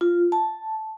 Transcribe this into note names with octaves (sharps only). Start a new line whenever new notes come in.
F4
A5